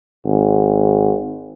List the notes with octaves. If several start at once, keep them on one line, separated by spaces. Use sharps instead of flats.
G#1